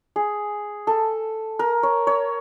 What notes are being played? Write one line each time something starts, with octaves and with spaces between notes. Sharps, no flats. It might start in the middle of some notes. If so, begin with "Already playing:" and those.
G#4
A4
A#4
C#5
C#5